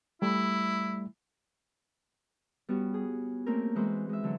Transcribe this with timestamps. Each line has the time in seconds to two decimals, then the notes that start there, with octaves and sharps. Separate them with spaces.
0.22 G3 A3 E4
2.69 G3 B3 C#4 F#4
2.94 G#4
3.46 A3 A#3 C4 C#4 A#4
3.76 E3 G#3 E4 F#4 B4 C5
4.09 G#3 E5
4.24 D3 E3 F#3